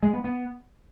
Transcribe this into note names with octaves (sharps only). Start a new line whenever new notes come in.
G#3
B3
B3